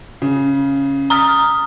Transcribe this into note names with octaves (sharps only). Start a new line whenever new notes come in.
C#3
A#5 D#6 F6